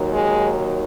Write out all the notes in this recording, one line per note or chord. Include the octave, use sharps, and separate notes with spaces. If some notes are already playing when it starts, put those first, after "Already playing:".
Already playing: D#2 D#3 F#3
G#3